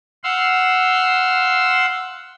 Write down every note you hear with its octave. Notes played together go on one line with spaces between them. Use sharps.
F5 F#5 C6 E6